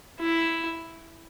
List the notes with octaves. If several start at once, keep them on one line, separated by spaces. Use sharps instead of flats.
E4